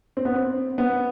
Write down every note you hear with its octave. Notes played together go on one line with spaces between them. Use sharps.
C4
B3
C4
B3